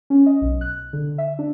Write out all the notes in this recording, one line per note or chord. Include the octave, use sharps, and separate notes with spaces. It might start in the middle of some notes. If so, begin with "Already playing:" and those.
C#4
D#5
B1
F#6
D3
E5
D4